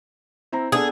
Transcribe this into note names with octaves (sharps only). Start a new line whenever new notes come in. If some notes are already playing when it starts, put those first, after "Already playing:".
C4 E4 A#5
B3 D4 G#4 A4